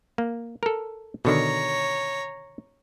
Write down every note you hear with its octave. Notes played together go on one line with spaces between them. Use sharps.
A#3
A4 A#4
B2 D3 D#3 C#5 A#5